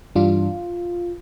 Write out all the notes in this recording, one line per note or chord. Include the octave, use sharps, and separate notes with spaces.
G2 E3 G3 D4 F4